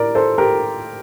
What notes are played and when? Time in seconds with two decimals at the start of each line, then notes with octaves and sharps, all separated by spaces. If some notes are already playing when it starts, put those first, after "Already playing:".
Already playing: A2 A#4 D5
0.15 A4 C5
0.38 G4 A#4